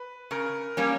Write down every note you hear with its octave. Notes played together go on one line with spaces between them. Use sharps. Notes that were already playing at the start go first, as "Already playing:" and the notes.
Already playing: B4
C#3 A#4
G3 A#3 C#4